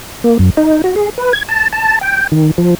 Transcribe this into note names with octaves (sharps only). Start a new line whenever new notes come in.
A#3
F#2
D#4
F#4
G#4
B4
G#6
A5
A5
G5
D#3
F3